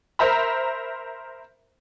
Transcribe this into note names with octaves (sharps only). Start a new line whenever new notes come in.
A#4 C5 E5 A#5 B5